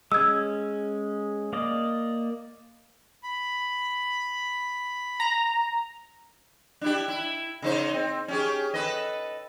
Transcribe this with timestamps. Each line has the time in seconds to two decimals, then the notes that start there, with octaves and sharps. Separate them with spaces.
0.12 G#3 C#4 E6 G#6
1.53 A#3 D5 D#5
3.23 B5
5.20 A#5
6.81 D4 E4 G4
7.08 E4
7.62 C#3 D#4 C5
7.94 C4
8.28 C#4 G4 G#4
8.74 A4 B4 D#5